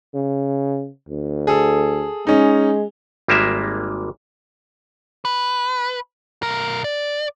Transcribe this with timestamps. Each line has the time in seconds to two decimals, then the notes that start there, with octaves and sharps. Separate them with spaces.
0.14 C#3
1.09 D2
1.47 G#4 A4
2.27 G#3 C#4 D#4
3.28 G#1 G3 G#3 A#3 E5
5.25 B4
6.43 B1 A#4
6.84 D5